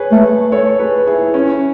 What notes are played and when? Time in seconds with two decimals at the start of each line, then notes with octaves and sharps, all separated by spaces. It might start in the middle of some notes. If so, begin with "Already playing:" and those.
Already playing: G#4 B4 C#5
0.12 A3
0.52 A4 C#5
0.79 G#4 B4
1.07 E4 G#4
1.34 C#4 E4